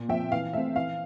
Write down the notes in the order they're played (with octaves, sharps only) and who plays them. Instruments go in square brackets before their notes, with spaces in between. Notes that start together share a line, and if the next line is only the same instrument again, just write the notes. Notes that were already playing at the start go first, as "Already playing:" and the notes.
Already playing: [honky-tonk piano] A#2
F3 C4 E5 G5
E3 F5
A3 C4 E5
E3 F5